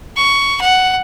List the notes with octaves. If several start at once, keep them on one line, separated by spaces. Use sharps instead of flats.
C#6
F#5